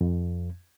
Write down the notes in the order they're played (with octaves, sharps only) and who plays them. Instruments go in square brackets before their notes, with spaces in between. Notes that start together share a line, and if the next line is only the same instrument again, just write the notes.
[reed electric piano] F2